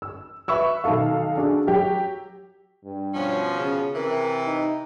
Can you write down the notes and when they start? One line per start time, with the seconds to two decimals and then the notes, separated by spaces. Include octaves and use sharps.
0.02 E6
0.48 B4 E5 B5 C#6 E6
0.84 B1 D#3 D#4 A4 F5
1.37 D4 F#4 G#4 A4
1.67 F#3 G4
2.84 G2
3.14 B2 F3 C#4
3.58 C#3
3.95 C3 E3 A#4
4.47 D#4